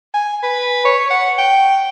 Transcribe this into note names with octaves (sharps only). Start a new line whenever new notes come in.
G#5
B4
C#5
F#5
G5